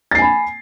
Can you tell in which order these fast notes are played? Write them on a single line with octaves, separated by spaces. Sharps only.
A6 C7 G#5 B5